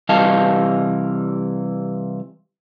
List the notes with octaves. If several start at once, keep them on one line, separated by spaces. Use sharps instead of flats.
C3 E3 G3 D#5 F5 A5